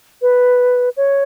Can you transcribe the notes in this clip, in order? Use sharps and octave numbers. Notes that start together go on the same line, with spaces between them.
B4
C#5